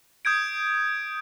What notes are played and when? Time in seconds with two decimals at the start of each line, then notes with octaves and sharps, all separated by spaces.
0.25 D#6 G6 G#6 D7